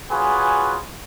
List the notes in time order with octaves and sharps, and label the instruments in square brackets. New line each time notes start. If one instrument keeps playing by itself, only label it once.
[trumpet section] F4 F#4 G#4 B4 C#5 G#5